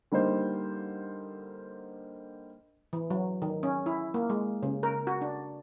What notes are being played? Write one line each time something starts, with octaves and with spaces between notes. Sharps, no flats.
D3 G3 A#3 D#4 C5
E3
F#3
D#3
C#4
E4
A#3
G#3
C#3
A#4
F#4
D4